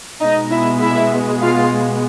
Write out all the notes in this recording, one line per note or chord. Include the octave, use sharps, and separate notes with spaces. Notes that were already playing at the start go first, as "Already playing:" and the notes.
B2 G#3 B3 D#4 D#5
E4 E5
E4 E5
F4 F5